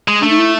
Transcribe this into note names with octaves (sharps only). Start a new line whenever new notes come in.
G#3
A3 D4
D#4
E4